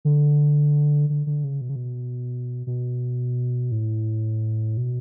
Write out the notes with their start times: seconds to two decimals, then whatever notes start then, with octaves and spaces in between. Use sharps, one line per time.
0.05 D3
1.10 D3
1.27 D3
1.44 C#3
1.61 B2
1.69 C#3
1.76 B2
2.67 B2
3.72 A2
4.77 B2